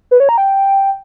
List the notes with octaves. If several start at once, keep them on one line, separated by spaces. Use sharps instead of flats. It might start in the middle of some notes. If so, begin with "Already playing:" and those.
B4
C#5
A#5
G5